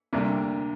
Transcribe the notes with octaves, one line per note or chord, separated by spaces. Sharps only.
D2 C3 G3 A#3 D4